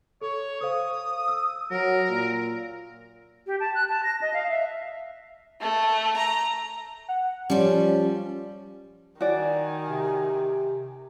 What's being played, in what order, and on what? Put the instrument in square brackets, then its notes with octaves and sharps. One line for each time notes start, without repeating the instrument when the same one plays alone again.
[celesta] A4 [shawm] C#5
[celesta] A4 C5 F5 [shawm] D#6
[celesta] E6
[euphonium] F#3 [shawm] A#4
[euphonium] A#2
[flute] G4
A5
F#6
A5
A#6
D#5
F5
E5
[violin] A3
A#5
[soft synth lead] F#5
[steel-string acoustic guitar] F3 G3 [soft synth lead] C#4
[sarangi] D#3 [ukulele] F#4 D5 [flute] G#5
[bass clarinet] C3